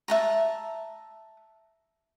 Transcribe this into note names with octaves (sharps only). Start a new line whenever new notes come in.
E5 A5 A#5